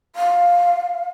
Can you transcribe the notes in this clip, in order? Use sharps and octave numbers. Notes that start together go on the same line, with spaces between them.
F5